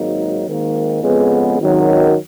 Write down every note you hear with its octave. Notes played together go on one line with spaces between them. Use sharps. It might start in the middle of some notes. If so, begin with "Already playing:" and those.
Already playing: G#1 G#2 F#3 A#3 D#4
G#1 G#2 D#3 A#3
F2 C#3 G#3 B3
G#1 F#2 D#3 F#3